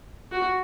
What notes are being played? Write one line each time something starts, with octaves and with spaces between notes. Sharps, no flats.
F#4